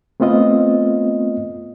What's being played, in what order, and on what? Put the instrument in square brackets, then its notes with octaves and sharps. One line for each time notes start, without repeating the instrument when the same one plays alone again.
[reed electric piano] A3 B3 C4 F4 D#5